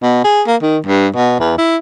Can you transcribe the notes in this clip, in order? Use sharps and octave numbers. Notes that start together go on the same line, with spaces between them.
B2
G#4
A#3
D#3
G2
B2
E2
E4